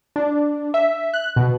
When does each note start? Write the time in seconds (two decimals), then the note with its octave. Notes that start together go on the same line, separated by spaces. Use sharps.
0.16 D4
0.74 E5
1.14 F#6
1.36 B2